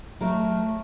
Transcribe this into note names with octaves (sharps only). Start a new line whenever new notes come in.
F#3 A3 A#4